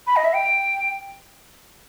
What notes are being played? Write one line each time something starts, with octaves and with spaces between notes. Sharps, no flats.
B5
D#5
E5
G5